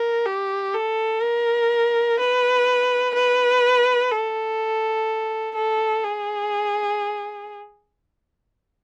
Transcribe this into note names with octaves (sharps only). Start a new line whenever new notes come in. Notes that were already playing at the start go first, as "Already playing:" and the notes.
Already playing: A#4
G4
A4
A#4
B4
B4
A4
A4
G#4